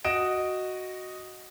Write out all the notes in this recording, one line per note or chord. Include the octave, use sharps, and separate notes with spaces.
F#4 D#5 D7 E7